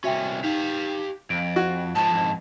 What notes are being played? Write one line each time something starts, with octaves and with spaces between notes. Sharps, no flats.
C2 C#4 F#4 E5 G5
D#4 G4 F5
F2 D7
F#4
G#2 F3 A5
F2 G#2